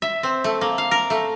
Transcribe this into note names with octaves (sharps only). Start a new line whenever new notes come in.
E5
C4
A3
A#3
F5
A#4
A3